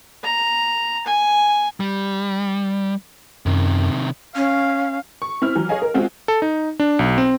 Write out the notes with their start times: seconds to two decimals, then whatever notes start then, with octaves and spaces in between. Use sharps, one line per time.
0.23 A#5
1.06 G#5
1.80 G3
3.46 F#2 C3 D#3
4.36 C#4 F5
5.22 C#6
5.42 C4 E4 F6
5.55 E3 F#3
5.69 G#4 C#5 D#5 F5 G#5
5.82 A#4
5.94 G#3 C4 F4 F#4
6.28 A4
6.42 D#4
6.79 D4
6.99 B1
7.18 C4